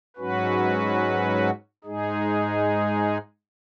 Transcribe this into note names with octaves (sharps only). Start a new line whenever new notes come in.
G#2 F#3 C#4 F#4 B4
G#2 G#3 D#4 G#4